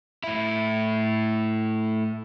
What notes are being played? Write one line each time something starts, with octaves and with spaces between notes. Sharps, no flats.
A2 E4